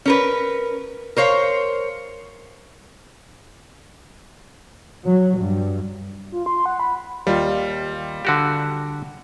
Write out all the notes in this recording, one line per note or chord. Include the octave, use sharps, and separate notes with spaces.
C#4 A#4 B4
A#4 C5 C#5 F5
F#3
G2
F4
C6
F#5
B5
D#2 G3 F4
D3 F#4 G4